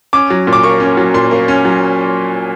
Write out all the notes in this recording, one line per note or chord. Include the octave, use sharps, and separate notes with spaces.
C#4 D6
F#3
A#2
D6
A#3 C#6
C#4
F#3
A#2 C6
A#3
C#4
F#3